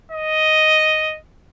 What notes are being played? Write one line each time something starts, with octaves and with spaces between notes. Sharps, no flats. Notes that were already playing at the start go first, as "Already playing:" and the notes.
D#5